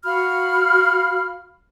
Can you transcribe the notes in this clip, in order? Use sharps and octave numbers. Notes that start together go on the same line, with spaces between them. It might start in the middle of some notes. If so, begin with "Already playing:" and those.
F#4 F5 B5 F6